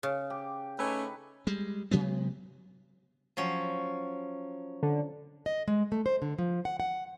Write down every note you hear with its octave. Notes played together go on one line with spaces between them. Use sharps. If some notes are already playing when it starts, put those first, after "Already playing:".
C#3
G4 D6
A3 C#4 D#4 B4
G3 G#3
C3 F#3 G#3 B3
F3 F#3 C#4
D3
D#5
G#3
A3
C5
D3
F3
F#5
F#5